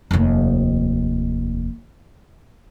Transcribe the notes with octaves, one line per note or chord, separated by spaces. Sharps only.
F1 D#2